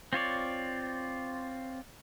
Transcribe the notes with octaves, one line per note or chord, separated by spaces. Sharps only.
C4 F4 C#5 D5